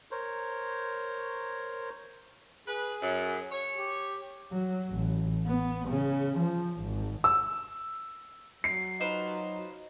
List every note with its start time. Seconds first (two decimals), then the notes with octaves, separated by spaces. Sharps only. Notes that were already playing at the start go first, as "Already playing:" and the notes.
0.11 A#4 C5 C#5
2.68 G#4 B4
3.02 F#2
3.52 C#5
3.77 G4
4.52 F#3
4.90 A1
5.46 B3
5.89 C#3
6.38 F3
6.80 G#1
7.24 E6
8.64 F#3 C7
9.00 D#4 F4 B4 C5